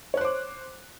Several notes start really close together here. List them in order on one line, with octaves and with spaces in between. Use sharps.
C#5 F#6 C5 D6